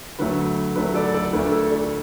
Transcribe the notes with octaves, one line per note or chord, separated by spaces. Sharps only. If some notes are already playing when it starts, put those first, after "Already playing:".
D2 D3 F#3 A3 B4
D2 D3 F#3 A3 B4
A4 D5
A4 D5
D2 D3 A3 B4
A4
A4 D5